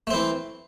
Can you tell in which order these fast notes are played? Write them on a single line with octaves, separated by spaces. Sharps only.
A3 C4 E3